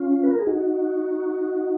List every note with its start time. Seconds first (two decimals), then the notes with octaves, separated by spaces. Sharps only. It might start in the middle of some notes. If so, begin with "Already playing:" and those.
Already playing: C#4 F4
0.23 B4
0.31 A#4
0.39 G#4
0.47 D#4 F#4